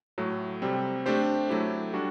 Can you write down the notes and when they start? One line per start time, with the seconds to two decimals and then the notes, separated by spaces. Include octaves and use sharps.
0.18 A2 F#3 A3
0.62 C3 G3 C4
1.06 A3 D4 G4 C5
1.49 F#3 A3 E4 G4
1.94 G3 D4 F#4